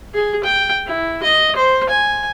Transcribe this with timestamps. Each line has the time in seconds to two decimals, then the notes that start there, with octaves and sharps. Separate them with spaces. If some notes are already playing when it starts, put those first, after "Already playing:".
0.14 G#4
0.44 G5
0.86 E4
1.23 D#5
1.56 C5
1.90 G#5